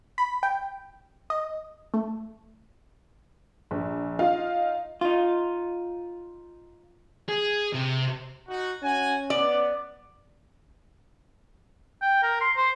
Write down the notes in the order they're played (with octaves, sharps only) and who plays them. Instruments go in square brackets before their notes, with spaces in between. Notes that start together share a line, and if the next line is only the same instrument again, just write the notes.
[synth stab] B5
G5
D#5
A3
[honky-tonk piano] A#1
D#4 F4 F5
[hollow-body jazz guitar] D#4 F4
[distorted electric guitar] G#4
C3
[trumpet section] D#4 F#4
[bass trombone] C#4 [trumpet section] F#4 G#5
[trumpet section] B3 [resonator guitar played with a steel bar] D5
[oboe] G5
A#4
C6
C5